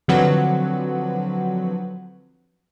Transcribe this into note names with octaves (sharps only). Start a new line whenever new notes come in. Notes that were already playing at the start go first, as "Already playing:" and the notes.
D3 F3 F#3 C4 B4 F#5